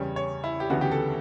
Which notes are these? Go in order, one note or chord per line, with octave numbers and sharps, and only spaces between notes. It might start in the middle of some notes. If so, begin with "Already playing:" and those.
Already playing: E2 C#3 G3 C#4 C#5
C#5
E4
G4
D2 C#3 E3 B3 F#4
G4
A4